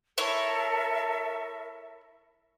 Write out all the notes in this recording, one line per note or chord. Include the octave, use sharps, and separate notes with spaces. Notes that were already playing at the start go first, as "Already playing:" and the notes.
E4 A4 A#4 C#5 E5